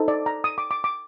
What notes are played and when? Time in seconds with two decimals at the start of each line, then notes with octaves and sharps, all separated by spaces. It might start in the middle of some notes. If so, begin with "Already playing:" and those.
Already playing: D#4 A4 C5
0.08 D5
0.26 A#5
0.44 D#6
0.58 D6
0.71 D6
0.84 D6